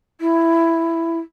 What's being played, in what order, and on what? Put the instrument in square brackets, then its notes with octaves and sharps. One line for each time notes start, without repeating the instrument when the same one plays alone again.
[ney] E4